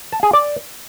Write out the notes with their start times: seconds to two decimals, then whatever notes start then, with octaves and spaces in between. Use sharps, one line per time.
0.12 A5
0.23 G#4
0.33 D5